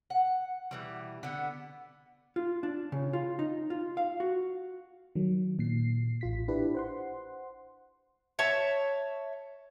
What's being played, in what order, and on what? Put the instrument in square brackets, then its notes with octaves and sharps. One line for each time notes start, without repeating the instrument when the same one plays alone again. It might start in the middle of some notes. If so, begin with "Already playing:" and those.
[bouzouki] F#5
B2 E3 G3
D3 B3
[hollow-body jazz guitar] F4
D4
C#3
F4
D#4
F4
F5
F#4
[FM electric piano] D#3 F#3
A#2 C7
A1 F4 B6
D4 E4 G4 B4
C5 F#5 C6
[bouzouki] C#5 E5 A5